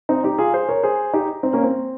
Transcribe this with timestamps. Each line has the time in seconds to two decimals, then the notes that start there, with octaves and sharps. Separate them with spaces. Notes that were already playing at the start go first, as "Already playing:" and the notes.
0.09 C4 D#4
0.24 D#4 G4
0.38 F4 G#4
0.54 G#4 C5
0.69 A#4 C#5
0.83 G#4 C5
1.13 D#4 G4
1.43 C4 D#4
1.53 A#3 C#4
1.63 C4